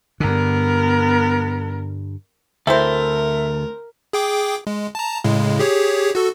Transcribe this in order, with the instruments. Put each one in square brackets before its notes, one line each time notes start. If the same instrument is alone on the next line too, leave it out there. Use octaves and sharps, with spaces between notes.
[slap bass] G2 D3 [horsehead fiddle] B3 A#4
[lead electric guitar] D2 A4 [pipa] C4 E4 C5 [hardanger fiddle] A#4 [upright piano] E5
[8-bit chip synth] G#4 G5 D6
G#3
A5 A#5
A2 C#3 G#3
G4 G#4 C#5
F#4 A4